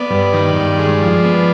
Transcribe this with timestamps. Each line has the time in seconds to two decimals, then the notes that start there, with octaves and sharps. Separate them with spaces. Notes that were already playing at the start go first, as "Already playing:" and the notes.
Already playing: B3 D5
0.10 G2
0.33 D#3
0.56 G2
0.79 G#3
1.02 F3
1.24 B3